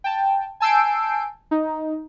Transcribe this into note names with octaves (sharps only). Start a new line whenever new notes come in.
G5 A5
G#5 A5 E6 G6 C7 D7
D#4